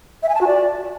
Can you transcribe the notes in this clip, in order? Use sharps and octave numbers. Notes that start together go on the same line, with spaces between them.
E5
G#5
A5
F#4
D5